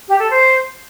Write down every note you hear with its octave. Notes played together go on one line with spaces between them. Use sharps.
G4
A4
C5